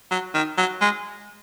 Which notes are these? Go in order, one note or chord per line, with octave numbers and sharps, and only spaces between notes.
F#3
D#3
F#3
G#3